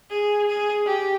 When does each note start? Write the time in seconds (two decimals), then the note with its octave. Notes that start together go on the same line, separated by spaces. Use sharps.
0.10 G#4
0.48 G#4
0.86 G4